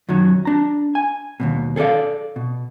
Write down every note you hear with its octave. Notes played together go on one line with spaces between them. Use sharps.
F#2 D#3 F#3
D4 A#5
G#5
D#2 G#2 B2
G#4 A4 B4 D5 F5
B2